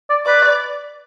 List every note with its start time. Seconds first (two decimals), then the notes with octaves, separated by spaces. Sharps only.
0.10 D5
0.26 B4 D5